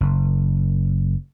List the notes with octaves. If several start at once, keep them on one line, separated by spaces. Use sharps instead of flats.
F#1